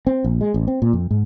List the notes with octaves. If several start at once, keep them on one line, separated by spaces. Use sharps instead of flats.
C4
A#1
G#3
A1
C4
A#2
F2
G#2